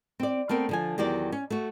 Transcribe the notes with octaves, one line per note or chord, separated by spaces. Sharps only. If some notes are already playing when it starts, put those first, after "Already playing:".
C4 D5
A3 B3 C4 A#4
D3 F3 G#5
E2 D#3 F#3 G4 D5
C#4
A3 F#4